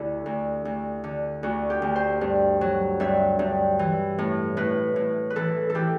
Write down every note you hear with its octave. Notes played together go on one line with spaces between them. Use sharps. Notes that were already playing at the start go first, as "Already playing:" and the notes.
Already playing: D2 D3 E4 G4
D2
D2
D3
D2 F#4
G4
D2
C5
G2
F#3
G2 E5
G2
E3
A2
A2 B4
A2
B4
E3 A4
A4
E3 G4